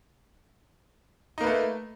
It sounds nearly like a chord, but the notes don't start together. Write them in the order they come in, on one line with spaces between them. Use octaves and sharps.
D#4 A#3 B4 A3